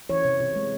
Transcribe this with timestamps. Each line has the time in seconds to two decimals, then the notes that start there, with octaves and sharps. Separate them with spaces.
0.10 E3 C#5
0.25 C3
0.40 C3
0.56 G#3